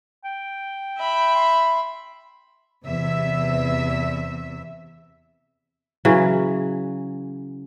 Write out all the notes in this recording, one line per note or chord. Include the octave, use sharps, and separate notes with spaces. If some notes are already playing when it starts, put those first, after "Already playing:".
G5
E5 B5
C6
E2 C3 E5
C#3 E3 F#3